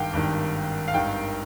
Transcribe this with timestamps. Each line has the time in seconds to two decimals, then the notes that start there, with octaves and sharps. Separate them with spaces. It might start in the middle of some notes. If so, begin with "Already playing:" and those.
Already playing: G#1 G2 D#3 F5 G5
0.13 G#1 G2 D#3
0.88 F5
0.94 G#1 G2 D#3 G5